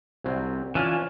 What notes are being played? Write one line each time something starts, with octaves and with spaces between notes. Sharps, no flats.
C2 F#3 C4
E3 C#4 D4 F4